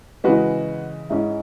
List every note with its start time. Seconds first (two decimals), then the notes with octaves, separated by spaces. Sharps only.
0.24 C#3 E3 G#3 F#4 B4
1.10 G#2 G#3 C#4 E4